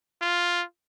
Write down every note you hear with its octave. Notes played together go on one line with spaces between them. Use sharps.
F4